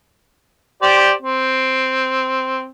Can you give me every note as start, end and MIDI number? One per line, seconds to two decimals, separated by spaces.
0.82 1.11 67
0.82 1.11 72
0.82 1.11 74
1.22 2.67 60